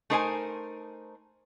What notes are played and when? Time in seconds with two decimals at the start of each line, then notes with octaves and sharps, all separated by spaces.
0.10 A3 D#4 A#4 C5 D#5 G#5